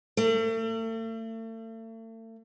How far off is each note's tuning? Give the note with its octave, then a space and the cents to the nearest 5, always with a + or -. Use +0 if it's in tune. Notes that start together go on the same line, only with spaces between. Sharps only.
A3 +40